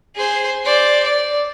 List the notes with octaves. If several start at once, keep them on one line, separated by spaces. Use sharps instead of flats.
G#4 C5
C5 D5
D5